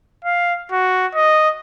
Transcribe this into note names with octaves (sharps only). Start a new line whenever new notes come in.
F5
F#4
D#5